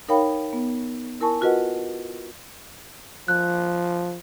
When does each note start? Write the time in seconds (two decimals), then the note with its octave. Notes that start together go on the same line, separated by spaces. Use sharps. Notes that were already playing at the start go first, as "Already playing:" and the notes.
0.08 D#4 A#4 C#5 F5 G5 B5
0.53 B3
1.21 E4 A#4 G#5 A5 C#6
1.41 F4 F#4 A#4 B4 D#5 F#5
3.28 F3 F#6